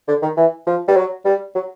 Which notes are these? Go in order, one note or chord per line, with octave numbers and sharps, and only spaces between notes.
D3
D#3
E3
F3
G3
F#3
G3
F#3